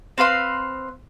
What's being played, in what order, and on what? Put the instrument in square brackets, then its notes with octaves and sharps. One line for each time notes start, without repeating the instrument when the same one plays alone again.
[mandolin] C4 B4 F5 C6